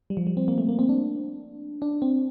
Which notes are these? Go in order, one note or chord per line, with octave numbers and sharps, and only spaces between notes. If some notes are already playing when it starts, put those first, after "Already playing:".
G3
F3
G3
C4
A#3
A3
A#3
C4
D4
D4
C4